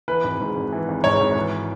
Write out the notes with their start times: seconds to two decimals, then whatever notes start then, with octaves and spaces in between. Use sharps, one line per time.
0.08 E3 B4
0.24 G#1
0.40 G#2
0.56 G#1
0.73 E3
0.88 G#1
1.04 G#2 C#5
1.20 G#1
1.35 E3